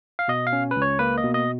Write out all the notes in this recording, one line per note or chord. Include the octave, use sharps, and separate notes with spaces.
F5
B2 D#5
F5
C#4
C#2 B4
C#5
A#3 B4
D#5
B2
D#5